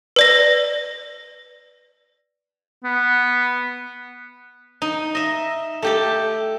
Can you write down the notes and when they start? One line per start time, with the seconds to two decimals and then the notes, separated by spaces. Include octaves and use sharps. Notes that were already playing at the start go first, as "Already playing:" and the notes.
0.16 B4 D5 A#6
2.84 B3
4.82 D#4
5.15 D#5 E5
5.82 A3 G4 A4